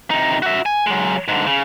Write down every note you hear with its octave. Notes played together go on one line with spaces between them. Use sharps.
C3 D#4
F#4 E5
G#5
F#3 G#3
G#2 D3
C#3